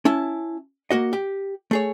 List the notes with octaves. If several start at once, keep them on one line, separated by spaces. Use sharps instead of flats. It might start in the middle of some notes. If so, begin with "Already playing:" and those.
C#4 E4 A5
A#3 F#4 D#5
G4
A3 G#4 C#5